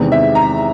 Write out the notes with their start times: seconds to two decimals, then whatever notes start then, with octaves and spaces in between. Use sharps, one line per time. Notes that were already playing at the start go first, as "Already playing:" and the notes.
Already playing: E2 C3 D#3 G#3 B3
0.12 E5
0.35 A#5